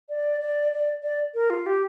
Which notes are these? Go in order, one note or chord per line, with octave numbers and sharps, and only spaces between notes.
D5
D5
D5
D5
A#4
F4
G4